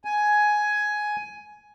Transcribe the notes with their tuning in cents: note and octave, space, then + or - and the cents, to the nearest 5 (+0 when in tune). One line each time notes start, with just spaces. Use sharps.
G#5 +10